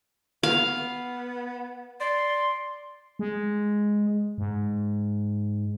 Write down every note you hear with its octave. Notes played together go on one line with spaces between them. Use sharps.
B3 F5
D5 C6
G#3
G#2